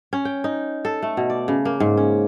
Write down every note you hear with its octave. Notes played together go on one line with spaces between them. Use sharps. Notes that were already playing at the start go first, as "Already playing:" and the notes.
C#4
G5
D#4
A4
A3
B2
D5
C#3
A#3
G#2
C#4